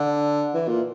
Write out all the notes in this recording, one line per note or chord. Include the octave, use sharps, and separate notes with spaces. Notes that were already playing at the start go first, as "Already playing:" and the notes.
Already playing: D3
E3
A#2